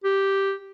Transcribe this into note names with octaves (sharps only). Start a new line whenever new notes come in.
G4